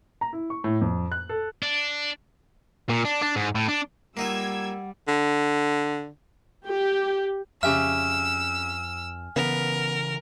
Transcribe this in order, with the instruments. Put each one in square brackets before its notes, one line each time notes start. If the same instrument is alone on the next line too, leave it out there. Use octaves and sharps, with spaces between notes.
[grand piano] A#5
E4
C#6
A2
F2
F#6
A4
[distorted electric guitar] D4
A#2
D4
D4
G#2
A2
D4
[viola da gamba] G3 [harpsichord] A#3 D#4 F4 [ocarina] F#5 [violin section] E6 G#6
[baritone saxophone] D3
[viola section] G4
[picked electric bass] F2 [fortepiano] C#3 G4 E5 [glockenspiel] G#5 F6 [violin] E6
[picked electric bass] C#3 E3 [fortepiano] B3 [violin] A#4